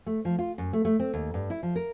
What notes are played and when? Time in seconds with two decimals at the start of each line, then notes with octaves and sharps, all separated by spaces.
0.06 A3
0.25 F3
0.39 F4
0.58 F#2
0.73 A3
0.85 A3
1.00 C4
1.14 D#2
1.34 G2
1.50 E4
1.63 F3
1.76 A#4